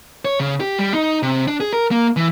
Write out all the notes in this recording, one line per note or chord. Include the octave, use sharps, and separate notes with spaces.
C#5
C#3
G4
G3
D#4
C3
D4
G#4
A#4
A#3
E3